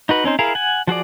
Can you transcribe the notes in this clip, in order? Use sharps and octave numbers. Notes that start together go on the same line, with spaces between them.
D#4 F#4 B4
C4 C#4 D#4 C5
E4 G#4 A#4 F5
F#5 G#5
F3 F#4 G#4 D5